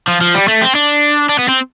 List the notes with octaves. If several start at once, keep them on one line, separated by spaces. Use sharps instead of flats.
F3
F3
G3
A3
C4
D4
D4
B3
C4